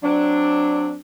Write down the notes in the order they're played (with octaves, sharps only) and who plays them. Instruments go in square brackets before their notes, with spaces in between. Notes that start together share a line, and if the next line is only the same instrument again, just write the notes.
[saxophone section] F#3 C4 D4